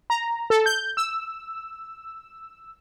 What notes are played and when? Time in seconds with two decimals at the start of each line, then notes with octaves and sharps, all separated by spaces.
0.10 A#5
0.50 A4
0.66 G6
0.97 E6